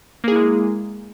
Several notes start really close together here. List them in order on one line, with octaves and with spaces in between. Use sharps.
A#3 G#4 E4 G#3